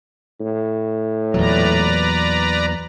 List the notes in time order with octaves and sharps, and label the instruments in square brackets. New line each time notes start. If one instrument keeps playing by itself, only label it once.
[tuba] A2
[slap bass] E2 A#2 F#3 [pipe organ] B4 D5 A#5